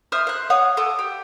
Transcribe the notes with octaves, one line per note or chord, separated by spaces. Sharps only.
C5 E5 D#6 F6
C5 F#6
C#5 F#5 D#6
A4 D6 D#6
G4